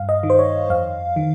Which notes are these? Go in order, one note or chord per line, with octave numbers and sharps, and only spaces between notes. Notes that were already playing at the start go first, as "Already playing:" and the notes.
Already playing: G2 F5
D#5
D#3
C5
C#5
F2 F5
D#3